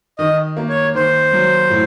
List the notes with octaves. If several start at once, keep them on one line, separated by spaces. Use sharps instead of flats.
D#3 D#5
A#3
C#5
D#3 C5
F#3
A2